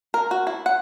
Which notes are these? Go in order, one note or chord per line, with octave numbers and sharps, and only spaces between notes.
A#4
F#4
E4
F#5